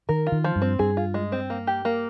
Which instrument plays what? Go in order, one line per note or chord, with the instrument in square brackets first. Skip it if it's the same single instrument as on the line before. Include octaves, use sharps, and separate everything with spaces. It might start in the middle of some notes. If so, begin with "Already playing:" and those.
[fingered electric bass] D#3 [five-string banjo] A#4
[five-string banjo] F4
[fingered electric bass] D#3
[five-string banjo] F3
[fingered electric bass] G2
[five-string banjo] C4
[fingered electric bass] G2 [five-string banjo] G#4
[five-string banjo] F4
G#3
C4
A#3
G4
A#3